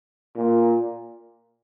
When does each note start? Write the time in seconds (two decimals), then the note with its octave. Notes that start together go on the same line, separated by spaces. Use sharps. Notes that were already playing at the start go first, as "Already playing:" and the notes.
0.36 A#2